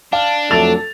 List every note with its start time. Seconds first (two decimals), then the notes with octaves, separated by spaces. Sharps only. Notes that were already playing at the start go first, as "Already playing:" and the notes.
0.13 D4 F5
0.51 F2 F#3 A3 A4 A6 F7